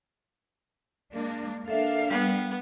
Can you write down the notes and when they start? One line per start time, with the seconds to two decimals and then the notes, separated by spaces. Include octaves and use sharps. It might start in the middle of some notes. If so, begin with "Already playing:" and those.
1.13 G#3 A#3 D4
1.68 A#3 D4 A4 E5 F5
2.10 G3 B3